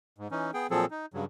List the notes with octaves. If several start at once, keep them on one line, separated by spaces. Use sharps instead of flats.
G#2
E3 C#4 D#4
B3 G#4 G5
A#2 F3 F#3 C4 G#4 A4
D#4
G2 C#3 F#3